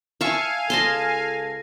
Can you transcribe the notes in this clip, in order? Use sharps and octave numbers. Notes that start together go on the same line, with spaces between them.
E5 F5 G#5 A5 C#6
C#2 A4 D#5 A5 C6 A#6 C7